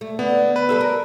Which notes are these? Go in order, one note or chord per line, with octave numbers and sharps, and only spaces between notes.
A3
D3 B3
B4
G3 A4 E5
A#4